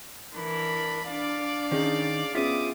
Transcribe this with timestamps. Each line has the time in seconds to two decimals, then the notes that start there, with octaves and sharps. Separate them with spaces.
0.34 E3 D4 A#4 B5
1.05 D4 D5 F5
1.71 D#3 C#4 D#4 G#4
2.35 G3 B3 C#4 F4 G#4 E5 D6 D#6